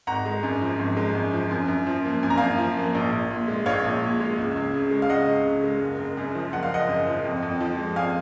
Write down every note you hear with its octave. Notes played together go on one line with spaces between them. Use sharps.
G#1 F#5 A#5
G#3
F#2
F3
G#1
G#3
F#2
F3
F#2
F#2
F3
A#3
F#2 G#5
A#5
F#2 F5 G#5
F3
A#3
A#1
A#1
A#2
G#3
A#1 C#5 F5
A#1
A#2
G#3
C#2
C#2
C#3
G#3
F5
C#2 D#5 F#5
C#2
C#3
G#3
F#1
F#1
F#2
F3
F#1 F#5
F5
F#1 D#5 F#5
F#2
F3
F2
F2
F3
G#3
F2 F5 G#5